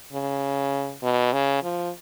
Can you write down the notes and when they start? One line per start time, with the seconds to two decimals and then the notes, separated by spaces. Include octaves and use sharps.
0.13 C#3
1.03 B2
1.33 C#3
1.63 F3